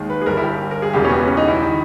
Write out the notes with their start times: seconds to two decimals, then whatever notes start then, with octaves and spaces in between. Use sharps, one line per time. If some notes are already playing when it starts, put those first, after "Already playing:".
Already playing: D#2 D#3 G#3
0.10 B4
0.21 G#4
0.26 G1 G2 G3 A#4
0.37 E4
0.43 G4
0.71 A#4
0.82 G#4
0.93 E1 E2 C#3 G3 G4
1.05 C#4
1.09 B3
1.27 C#4
1.37 D#4
1.48 E4
1.62 D#3